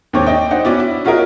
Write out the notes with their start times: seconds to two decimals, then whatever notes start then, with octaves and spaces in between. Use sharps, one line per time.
0.13 D#2 G#2 C4 C#5 D6
0.26 D4 D#5 G5
0.51 D4 D#4 C5 F#5
0.65 B3 C#4 D4 E4 F#4 D5
0.80 E4
1.05 C#4 F4 F#4 G#4 A#4 D#5